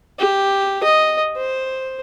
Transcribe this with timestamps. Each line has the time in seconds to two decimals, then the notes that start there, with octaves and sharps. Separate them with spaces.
0.19 G4
0.83 D#5
1.37 C5